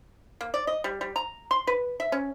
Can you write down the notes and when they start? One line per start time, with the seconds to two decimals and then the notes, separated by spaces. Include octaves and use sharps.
0.41 A#3
0.54 D5
0.67 D#5
0.84 G3
1.01 G3
1.16 A#5
1.51 C6
1.67 B4
2.00 E5
2.12 C#4